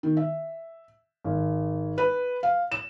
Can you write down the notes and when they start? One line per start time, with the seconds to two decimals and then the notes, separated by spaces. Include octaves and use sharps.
0.03 D#3
0.17 E5
1.24 G#1
1.98 B4
2.43 F5
2.72 E7